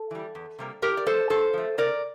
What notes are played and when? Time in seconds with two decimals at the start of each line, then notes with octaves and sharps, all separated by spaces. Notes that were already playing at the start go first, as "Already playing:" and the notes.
Already playing: A4
0.11 E3 G3
0.35 E2
0.59 C3 G3 A#3
0.82 A2 G4 A#4
0.97 D5
1.06 F3 A3 A4 C5
1.30 G2 A4 C5
1.53 F3 A3
1.78 C3 A#4 D5